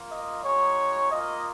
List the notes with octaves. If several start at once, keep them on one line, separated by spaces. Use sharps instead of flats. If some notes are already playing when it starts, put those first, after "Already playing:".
Already playing: A#3 F4
D#5
G#3 D#4 F#4 C#5
A#3 F4 D#5